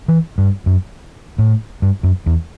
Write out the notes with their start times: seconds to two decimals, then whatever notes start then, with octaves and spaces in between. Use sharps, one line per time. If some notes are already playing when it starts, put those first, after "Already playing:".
0.08 E3
0.38 G2
0.66 F#2
1.38 A2
1.82 G2
2.03 F#2
2.26 E2